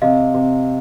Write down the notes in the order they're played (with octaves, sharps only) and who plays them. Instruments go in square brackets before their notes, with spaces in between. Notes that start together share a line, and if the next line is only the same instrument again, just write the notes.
[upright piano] C3 [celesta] D#5 F5
[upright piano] C3